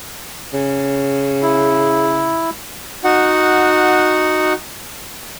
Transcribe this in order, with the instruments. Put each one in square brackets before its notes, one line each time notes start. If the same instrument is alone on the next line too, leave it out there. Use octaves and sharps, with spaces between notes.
[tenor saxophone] C#3
[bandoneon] E4
[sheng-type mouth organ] D#4 F#4 F#5